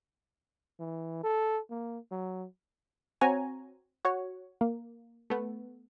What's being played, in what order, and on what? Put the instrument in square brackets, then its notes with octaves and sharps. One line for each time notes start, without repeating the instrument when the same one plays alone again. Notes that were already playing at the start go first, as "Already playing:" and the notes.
[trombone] E3
A4
A#3
F#3
[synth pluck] C4 F#4 C#5 G#5 A#5
F#4 C#5
A#3
A3 B3